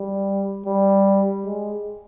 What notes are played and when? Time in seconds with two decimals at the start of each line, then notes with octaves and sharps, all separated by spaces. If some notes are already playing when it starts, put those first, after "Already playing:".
Already playing: G3
0.66 G3
1.45 G#3